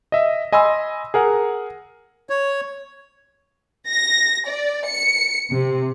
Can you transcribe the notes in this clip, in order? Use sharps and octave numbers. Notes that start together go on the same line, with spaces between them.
D#5 E5
D#5 G#5 B5 C6 E6
G#4 A#4 F#5
C#5
A#6
D5
C#7
C3